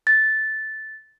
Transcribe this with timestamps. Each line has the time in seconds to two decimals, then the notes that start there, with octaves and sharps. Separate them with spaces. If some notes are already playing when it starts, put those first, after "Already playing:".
0.07 A6